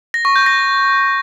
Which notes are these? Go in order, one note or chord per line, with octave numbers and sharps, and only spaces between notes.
A#6
C#6
G6
A#6